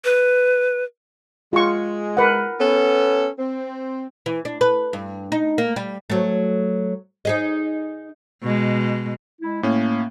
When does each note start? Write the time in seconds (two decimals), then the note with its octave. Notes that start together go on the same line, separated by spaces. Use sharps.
0.05 B4
1.53 G#3 F4 C#6
2.17 A#4 B4 F#5
2.59 B3 C#4 A4
3.39 C4
4.26 E3
4.45 D4
4.61 B4
4.93 G2
5.32 D#4
5.58 A#3
5.76 G3
6.10 F#3 A3
7.25 D#4 G#4 D#5
8.42 B2 G#3
9.42 G#3 E4
9.63 A2 A#3 C#4